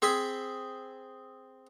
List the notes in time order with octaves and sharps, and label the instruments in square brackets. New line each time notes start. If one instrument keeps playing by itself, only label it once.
[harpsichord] C4 G#4 C5 G#5 B5